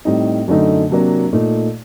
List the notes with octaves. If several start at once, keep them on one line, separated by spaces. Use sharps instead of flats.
A2 G3 C4 D#4
F#2 D3 A3 D#4
C3 F#3 A#3 D4
A#2 A3 D#4